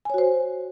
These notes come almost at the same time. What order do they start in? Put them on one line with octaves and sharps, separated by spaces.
G#5 C#5 F#4 C5